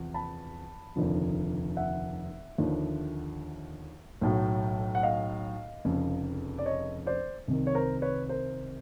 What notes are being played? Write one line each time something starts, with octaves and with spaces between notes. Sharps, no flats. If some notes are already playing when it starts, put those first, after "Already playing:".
Already playing: E2 C3 F3
A5 B5
F1 D#2 D3 F3
E5 F#5
D#2 D3 F3
B1 A2 F#3
F#5
D#5 F5
F1 F2 C#3
D5
C#5 D#5
C5 D5
C2 C3 D#3
C#5
A#4 C5
B4 C#5
A#4 C5